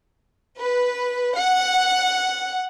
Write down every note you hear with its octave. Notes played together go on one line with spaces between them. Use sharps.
B4
F#5